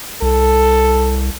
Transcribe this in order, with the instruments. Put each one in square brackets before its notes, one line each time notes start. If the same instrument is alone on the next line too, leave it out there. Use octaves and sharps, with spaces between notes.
[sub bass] C2 [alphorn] A4